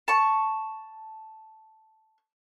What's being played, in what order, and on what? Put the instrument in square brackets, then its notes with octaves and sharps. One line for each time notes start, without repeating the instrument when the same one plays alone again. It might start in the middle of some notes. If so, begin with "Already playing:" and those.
[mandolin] A5 C#6